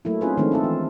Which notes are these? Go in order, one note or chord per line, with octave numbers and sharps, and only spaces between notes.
F#3 A3 A#3 E4
C4 C#4 D#4 F4 G#4 B4
D#3 F3 G#3 A3 C4 D4
C4 F4 A4
E3